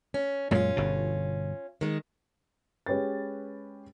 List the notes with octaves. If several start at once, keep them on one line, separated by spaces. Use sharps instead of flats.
C#4
F#2 A#2 G#3 C#4 F4
G1 B2
D#3 G#3
G#3 C#4 G4 B4 A6